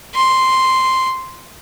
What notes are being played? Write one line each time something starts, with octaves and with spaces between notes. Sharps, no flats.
C6